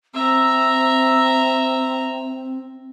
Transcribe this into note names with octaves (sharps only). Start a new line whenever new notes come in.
C4 E5 A#5